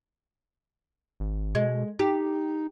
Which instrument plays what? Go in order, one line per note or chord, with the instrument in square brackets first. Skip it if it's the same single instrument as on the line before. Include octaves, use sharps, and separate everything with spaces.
[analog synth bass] G#1
[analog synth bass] B2 [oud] G#3
[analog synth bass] D#4 [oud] G4